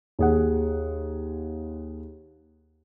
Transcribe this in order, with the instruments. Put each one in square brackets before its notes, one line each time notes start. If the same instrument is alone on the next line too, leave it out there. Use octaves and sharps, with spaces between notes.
[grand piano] D#2 G#4 F#5